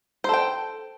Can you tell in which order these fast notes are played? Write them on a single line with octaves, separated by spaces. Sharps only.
C5 A4 G5